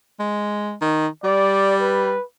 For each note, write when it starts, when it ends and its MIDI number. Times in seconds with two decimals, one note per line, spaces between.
0.20 0.74 56
0.81 1.07 51
1.24 2.14 55
1.24 1.75 74
1.81 2.24 71